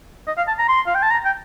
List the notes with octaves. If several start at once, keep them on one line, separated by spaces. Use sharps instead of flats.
D#5
F5
A5
A#5
C6
F5
G5
A5
A#5
G5